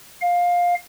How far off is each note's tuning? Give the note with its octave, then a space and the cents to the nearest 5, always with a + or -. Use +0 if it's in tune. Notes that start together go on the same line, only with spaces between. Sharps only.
F5 +15